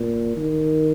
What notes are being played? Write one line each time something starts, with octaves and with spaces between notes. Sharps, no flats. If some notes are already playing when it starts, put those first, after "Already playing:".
Already playing: A#2
D#3